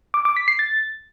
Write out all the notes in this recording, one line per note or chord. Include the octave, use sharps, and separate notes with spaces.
D6
D6
B6
C7
A6